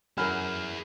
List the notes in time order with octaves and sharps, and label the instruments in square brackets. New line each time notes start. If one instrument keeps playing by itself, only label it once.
[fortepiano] F#2 F6 [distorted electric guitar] E4 G#4 [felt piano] A#4 B5